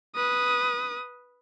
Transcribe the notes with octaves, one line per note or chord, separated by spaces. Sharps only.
B4 D#6